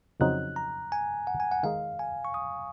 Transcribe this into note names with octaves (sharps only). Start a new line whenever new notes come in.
F2 C#3 F#3 C4 D#4 F#6
A#5
G#5
F#5
G#5
F#5
D#3 G#3 D#4 G#4 F5
G#5
C#6
D#6